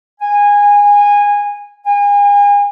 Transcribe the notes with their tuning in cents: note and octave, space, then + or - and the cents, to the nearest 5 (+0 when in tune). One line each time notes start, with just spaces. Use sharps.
G#5 -20
G#5 -35